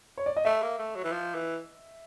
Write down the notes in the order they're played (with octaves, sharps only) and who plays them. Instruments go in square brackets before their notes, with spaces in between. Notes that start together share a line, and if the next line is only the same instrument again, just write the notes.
[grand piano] C#5
D5
D#5
[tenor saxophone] A3 [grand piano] E5
[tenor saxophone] A#3
A3
F#3
E3
F3
E3